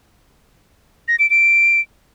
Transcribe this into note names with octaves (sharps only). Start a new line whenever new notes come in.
A#6
D7
D7